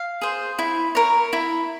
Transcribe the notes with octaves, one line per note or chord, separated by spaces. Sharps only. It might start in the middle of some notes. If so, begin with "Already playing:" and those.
Already playing: F5
G#4 C5
E4
A#4 C#5
E4